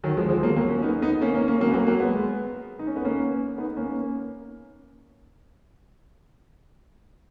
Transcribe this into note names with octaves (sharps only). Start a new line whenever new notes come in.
D#3 F#3
F3 G#3
F3 G#3
F#3 A#3
F#3 A#3
A#3 C#4
B3 D#4
B3 D#4
A#3 C#4
A#3 C#4
A#3 C#4
F#3 A#3
B3
F#3 A#3
F#3 A#3
G#3 B3
D#4
C#4
B3
A#3 C#4
B3 D#4
A#3 C#4